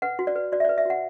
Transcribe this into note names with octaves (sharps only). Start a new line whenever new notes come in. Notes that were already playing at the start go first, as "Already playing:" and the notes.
B4 F#5
F#4
D5
B4
F#4 D5
E5
D5
B4
E5
F#4 F#5